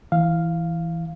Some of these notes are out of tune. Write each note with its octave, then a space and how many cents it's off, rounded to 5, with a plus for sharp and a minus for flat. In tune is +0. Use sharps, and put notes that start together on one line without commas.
E3 +0 F5 +0